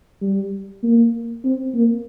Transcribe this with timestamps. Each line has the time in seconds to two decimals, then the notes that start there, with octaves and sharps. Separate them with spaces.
0.22 G3
0.83 A#3
1.45 C4
1.75 A#3